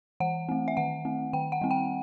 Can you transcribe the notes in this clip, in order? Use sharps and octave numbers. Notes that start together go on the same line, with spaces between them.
E3 F#5
A3 C4
E5
D#3 F#5
A3 C4
D#3 G5
F#5
G3 C4
G5